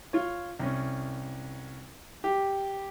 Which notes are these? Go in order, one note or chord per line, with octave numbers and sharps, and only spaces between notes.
F4 C#5
C2 C#4
G4